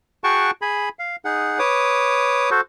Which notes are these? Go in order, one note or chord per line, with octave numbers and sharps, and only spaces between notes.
F#4 G#4 F#5 G5 A5 C#6
G#4 G#5 B5
F5
D#4 G#4 F#5
B4 C#5 D6 D#6
F#4 A4 C5